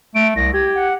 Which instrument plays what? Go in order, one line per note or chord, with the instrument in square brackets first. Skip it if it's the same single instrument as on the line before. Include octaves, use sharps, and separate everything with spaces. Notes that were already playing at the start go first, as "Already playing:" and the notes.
[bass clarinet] A3 [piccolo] D7
[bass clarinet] C2 [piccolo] A#6
[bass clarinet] G4 [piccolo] G#6
[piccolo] F#5